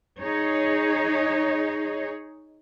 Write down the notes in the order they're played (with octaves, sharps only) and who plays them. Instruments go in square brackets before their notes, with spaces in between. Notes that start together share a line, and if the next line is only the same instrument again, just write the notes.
[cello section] D#4 G#4 C#5